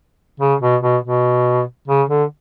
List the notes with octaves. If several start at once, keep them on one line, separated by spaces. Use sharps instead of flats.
C#3
B2
B2
B2
C#3
D3